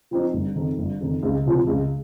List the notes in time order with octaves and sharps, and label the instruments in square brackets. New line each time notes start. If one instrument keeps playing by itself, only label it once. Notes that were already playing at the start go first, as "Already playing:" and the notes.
[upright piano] F3 C4 D#4
G1
F2 D#3
G1
F2 D#3
C#2
C3 F3
C#2